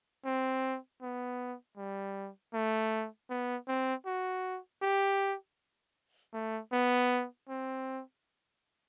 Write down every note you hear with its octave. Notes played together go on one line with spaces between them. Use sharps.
C4
B3
G3
A3
B3
C4
F#4
G4
A3
B3
C4